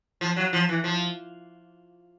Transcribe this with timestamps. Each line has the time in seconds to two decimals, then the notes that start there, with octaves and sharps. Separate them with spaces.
0.21 F3
0.36 F#3
0.53 F3
0.69 E3
0.84 F3